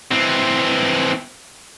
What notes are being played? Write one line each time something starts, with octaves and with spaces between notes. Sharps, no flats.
E3 C4